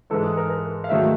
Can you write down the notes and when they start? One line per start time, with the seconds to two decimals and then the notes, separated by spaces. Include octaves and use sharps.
0.10 G#2 E3 G#3 A4
0.24 G#4
0.37 A#4
0.50 A#4
0.84 F5
0.89 G#2 D#3 F#3 A3 E5